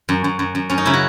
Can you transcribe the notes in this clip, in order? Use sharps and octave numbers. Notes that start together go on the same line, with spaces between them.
F#2
F#2
F#2
F#2
F#2 C#4
D#4
C#3 E4
F#4